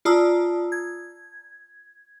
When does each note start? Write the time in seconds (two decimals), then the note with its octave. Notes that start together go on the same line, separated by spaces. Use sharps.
0.05 F4 D5 A5 A#5 D#6 E6
0.72 G#6